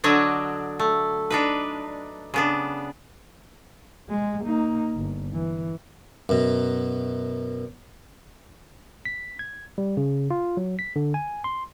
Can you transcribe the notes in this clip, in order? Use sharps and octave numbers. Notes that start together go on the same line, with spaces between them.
D3 F#3 D4 C#5 D#5
A3
D4 D#4 B4
C#3 B3 D4
G#3
A#3 D#4
G1
E3
F#2 B2
B6
G#6
G3
C#3
F4
F#3
B6
D3
G#5
C6